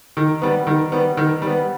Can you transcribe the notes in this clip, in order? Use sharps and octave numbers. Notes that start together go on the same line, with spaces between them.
D#3
G3 B3
D#3
G3 B3
D#3
G3 B3